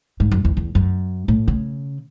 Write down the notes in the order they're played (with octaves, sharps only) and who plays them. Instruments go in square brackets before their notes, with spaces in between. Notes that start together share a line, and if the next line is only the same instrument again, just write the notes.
[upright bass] G#2
F#2
E2
E2
F#2
A2
C#3